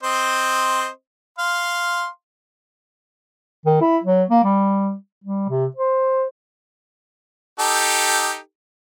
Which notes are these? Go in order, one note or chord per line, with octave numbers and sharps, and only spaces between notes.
C4 C5 D#5
F5 C6
D#3
E4
F#3
A#3
G3
G3
C3
C5
D#4 G4 A4